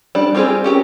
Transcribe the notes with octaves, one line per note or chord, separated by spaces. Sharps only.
G3 D4
G3 C4 F4 G4 G#4
C#4 G4 A#4